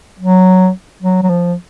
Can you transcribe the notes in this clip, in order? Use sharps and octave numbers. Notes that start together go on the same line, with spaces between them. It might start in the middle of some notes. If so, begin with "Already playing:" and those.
F#3
F#3
F#3
F3